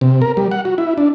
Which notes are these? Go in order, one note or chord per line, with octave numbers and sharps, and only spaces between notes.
C3
A#4
G3
F#5
F#4
E4
D4